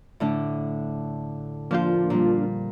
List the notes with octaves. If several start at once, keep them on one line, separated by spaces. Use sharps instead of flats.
A2 D3 D4
F3 A#3 D4 F4 G6
A#2 G3